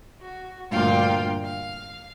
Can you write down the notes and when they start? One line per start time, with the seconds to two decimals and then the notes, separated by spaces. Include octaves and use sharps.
0.21 F#4
0.70 D2 G2 A#2 F4 F5 G5
1.44 F5